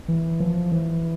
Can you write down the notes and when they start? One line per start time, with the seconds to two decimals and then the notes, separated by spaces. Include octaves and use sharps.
0.08 E3
0.40 F3
0.72 E3